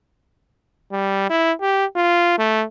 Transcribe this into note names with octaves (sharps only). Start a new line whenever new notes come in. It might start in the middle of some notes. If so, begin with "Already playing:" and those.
G3
E4
G4
F4
A3